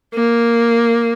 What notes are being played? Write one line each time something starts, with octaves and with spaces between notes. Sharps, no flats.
A#3